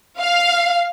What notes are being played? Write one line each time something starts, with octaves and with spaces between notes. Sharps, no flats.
F5